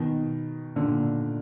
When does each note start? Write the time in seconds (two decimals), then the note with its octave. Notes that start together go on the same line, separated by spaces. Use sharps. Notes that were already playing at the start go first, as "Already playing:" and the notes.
Already playing: B2 D#3
0.76 A#2 D3